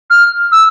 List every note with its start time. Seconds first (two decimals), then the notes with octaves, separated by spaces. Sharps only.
0.10 F6
0.52 E6